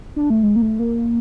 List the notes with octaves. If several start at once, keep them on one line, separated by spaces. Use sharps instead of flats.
D4
A3
G#3
A#3
A3
A#3